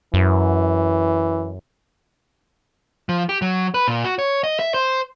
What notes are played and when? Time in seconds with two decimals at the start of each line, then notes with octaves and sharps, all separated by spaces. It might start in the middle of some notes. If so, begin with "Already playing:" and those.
0.14 F#2 E3
3.09 F3
3.29 G4
3.42 F#3
3.74 B4
3.88 A#2
4.04 F#4
4.19 C#5
4.44 D#5
4.59 E5
4.74 C5